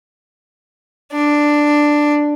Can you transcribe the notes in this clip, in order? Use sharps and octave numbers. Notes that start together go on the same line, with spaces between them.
D4